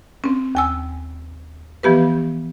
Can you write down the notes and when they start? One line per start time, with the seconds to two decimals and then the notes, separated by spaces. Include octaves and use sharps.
0.24 C4 C#4
0.55 D#2 G#5 E6
1.83 E3 F3 B3 G4 B4